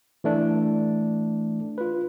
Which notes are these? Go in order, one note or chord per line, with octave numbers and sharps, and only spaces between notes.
E3 A3 D4
F4 B4